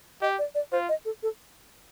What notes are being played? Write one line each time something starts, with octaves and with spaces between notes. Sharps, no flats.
G4 D#5
D5
D5
F4 C5
D#5
A4
A4